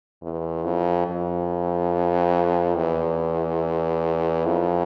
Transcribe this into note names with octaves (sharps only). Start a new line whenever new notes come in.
E2
F2
F2
E2
F2